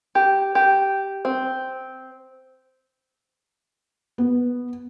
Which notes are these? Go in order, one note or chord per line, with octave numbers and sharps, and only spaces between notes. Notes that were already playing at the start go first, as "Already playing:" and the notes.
G4
G4
C4
B3